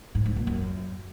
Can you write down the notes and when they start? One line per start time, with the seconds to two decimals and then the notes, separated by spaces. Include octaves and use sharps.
0.15 G#2
0.26 G#2
0.36 A#2
0.47 F#2